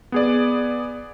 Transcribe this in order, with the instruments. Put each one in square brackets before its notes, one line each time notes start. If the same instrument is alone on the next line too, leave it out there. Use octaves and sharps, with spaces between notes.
[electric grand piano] B3 G#4 D5